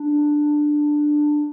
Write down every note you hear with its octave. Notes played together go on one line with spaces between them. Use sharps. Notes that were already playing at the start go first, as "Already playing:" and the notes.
Already playing: D4